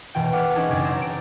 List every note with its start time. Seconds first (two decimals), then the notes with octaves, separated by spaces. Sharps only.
0.15 D#1 B2 E3 G5
0.33 F#5 D6 F6
0.55 C4 C#4 D#4 E4 G#4 A4
0.68 F#1 C#3 D6 A6
0.83 A#5 C6 E6 G6 A#6
1.01 D7